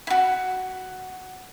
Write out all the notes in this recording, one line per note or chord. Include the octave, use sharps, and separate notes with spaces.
E4 F#4